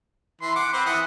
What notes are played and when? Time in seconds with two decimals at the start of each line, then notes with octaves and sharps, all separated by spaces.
0.42 E3 C6
0.55 F#5 D6
0.73 C4 B4 C5
0.86 E3 F#5 D#6